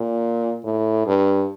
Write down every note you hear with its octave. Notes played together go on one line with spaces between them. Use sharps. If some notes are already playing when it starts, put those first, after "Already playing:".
Already playing: A#2
A2
G2